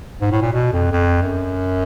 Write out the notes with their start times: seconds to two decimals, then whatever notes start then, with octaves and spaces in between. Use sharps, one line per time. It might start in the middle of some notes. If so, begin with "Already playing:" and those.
0.21 G#2
0.31 A2
0.42 A#2
0.53 B2
0.73 F2
0.92 F2
1.22 F#2